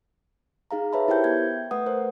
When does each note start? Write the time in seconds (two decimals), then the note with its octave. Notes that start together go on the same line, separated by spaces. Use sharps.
0.71 D#4 G#4 F5 A#5
0.93 B4 C#5 E5 A5 B5
1.08 E4 G4 A#4 C5 G5 G6
1.24 B3 E5 G6 G#6
1.71 A3 B4 F#5 D#6
1.86 A#4 C5